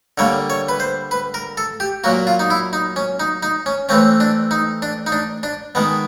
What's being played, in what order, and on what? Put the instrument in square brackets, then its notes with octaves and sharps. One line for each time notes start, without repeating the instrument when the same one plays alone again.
[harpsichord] D3 G3 A#3 C#5
C#5
B4
C5
B4
A#4
A4
G4
A#2 F#3 A#3 F#4
F4
D#4
E4
D#4
C#4
D#4
D#4
C#4
E3 A3 C4 C#4
D4
D#4
D4
D#4
D4
D4
D#3 G#3 B3